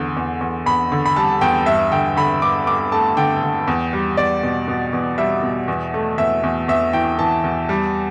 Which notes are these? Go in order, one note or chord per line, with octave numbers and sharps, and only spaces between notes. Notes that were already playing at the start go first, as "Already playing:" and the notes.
Already playing: E2 D3
E2
E2
E2 B5
D3
B5
G3 A5
E2 G5
G2 E5
D3 G5
D3 B5
G2 D6
G2 D6
A3 A5
D3 G5
D3
E2
G3
E2 D5
B2
B2
E2
G3 E5
B2
E2
A3
E2 E5
E2
E2 E5
E3 G5
E3 A5
E2
G3